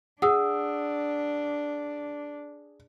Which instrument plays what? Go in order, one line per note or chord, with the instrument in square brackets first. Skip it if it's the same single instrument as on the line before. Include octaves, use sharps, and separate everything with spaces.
[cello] D4 [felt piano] G#4 [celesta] F#5 D#6 E6